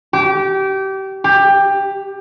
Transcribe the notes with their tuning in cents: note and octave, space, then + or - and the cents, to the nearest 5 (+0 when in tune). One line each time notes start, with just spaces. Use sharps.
G4 -25
G4 +15